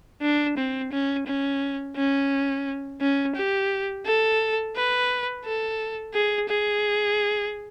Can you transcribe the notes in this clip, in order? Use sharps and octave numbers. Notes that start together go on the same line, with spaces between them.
D4
C4
C#4
C#4
C#4
C#4
G4
A4
B4
A4
G#4
G#4